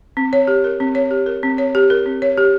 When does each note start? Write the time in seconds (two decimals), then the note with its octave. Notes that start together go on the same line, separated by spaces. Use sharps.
0.17 C4
0.33 C#5
0.48 G4
0.64 A#4
0.80 C4
0.95 C#5
1.11 G4
1.26 A#4
1.43 C4
1.58 C#5
1.75 G4
1.90 A#4
2.06 C4
2.22 C#5
2.38 G4